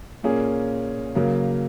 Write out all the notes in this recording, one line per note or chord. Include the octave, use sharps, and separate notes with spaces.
A#2 A#3 C#4 G#4
C#3 F#3 A#3